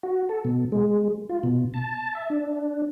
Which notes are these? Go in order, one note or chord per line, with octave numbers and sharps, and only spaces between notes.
F#4
A4
B2
G#3
F4
B2
A5
E5
D4